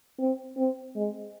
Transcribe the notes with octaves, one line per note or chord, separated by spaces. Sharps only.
C4
C4
G#3